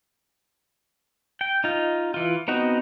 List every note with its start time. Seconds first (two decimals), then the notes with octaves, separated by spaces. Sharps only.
1.41 G5
1.64 D#4 F4
2.14 E3 F4
2.48 B3 C4 D#4 F#4